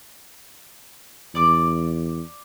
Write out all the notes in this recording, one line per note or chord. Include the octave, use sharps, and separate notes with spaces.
E2 D5 D6